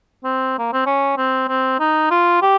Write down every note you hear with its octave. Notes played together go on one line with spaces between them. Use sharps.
C4
A#3
C4
C#4
C4
C4
D#4
F4
G4